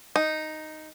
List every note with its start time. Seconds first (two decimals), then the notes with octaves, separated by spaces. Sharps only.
0.16 D#4